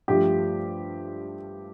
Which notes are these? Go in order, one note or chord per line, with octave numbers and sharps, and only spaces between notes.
G2 F3 A3 G4